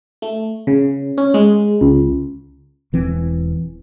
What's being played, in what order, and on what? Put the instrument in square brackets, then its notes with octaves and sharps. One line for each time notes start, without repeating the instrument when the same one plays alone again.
[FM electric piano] A3
C#3
C#4
G#3
C#2
[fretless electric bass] E1 E3 C4